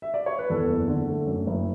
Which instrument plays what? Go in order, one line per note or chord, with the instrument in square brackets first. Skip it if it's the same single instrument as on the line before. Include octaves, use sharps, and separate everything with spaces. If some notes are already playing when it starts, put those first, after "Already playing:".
[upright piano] E5
D5
C#5
B4
E2 A4
F#1
D3
A3
F#2
F#1